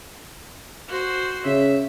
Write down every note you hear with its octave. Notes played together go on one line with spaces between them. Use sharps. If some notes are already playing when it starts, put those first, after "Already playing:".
F#4 C5
C#3 E5